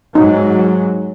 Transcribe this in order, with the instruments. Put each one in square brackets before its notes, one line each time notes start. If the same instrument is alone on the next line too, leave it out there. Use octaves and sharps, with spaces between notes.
[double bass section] G#2 F#3 [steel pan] D#4